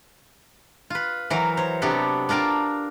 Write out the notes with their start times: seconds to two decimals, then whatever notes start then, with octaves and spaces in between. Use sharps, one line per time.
0.90 F4 B4
1.30 E3 F#3 A#4
1.57 C5 C#5
1.82 C3 F#3 B3 D4 G4 A4
2.29 D4 F4 A#4 G5 A5